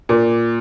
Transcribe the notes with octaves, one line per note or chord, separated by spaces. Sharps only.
A#2